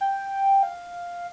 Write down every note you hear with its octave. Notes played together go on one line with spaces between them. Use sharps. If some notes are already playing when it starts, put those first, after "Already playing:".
G5
F5